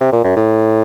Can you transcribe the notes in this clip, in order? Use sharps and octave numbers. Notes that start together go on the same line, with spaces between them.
C3
A#2
F#2
A2